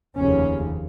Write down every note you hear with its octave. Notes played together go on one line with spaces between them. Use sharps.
F1 D#2 C#3 C#4